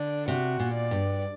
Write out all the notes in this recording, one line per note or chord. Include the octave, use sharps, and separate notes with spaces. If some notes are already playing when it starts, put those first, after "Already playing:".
Already playing: D3 D4
C3 F#4
A#2
D5
G2